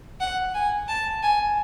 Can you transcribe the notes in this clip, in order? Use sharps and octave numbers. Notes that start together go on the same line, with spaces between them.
F#5
G#5
A5
G#5